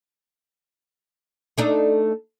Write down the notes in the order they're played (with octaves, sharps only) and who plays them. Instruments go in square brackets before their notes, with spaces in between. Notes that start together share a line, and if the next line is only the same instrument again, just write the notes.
[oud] A3 D4 D#4